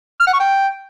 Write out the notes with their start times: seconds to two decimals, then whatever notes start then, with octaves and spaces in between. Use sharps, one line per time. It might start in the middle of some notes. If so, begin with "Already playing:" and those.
0.20 F6
0.27 F#5
0.33 C#6
0.40 G5